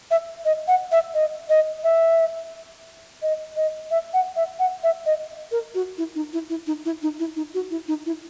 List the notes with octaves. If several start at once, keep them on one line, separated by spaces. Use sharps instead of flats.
E5
D#5
F#5
E5
D#5
D#5
E5
D#5
D#5
E5
F#5
E5
F#5
E5
D#5
A#4
F#4
E4
D#4
E4
E4
D#4
E4
D#4
E4
D#4
F#4
E4
D#4
E4